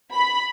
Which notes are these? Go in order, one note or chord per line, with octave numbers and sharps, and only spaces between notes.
B5